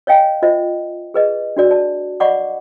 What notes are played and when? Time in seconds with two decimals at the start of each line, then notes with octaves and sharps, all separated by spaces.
0.07 C#5 D#5 F5 G5 G#5
0.42 F4 C5 D#5 E5
1.14 G#4 B4 D#5
1.57 D4 F#4 D5
1.71 D5 A5
2.20 D5 D#5 F#5 B5 C#6 D6